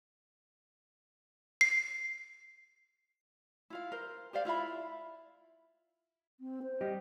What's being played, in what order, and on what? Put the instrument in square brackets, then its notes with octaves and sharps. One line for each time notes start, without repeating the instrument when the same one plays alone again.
[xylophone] C7
[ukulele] E4 F4 F5
A#4 C5
G4 C5 D5 F5
E4 F4 E5 B5
[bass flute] C4
C5
[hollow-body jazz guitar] G3 G4 D#5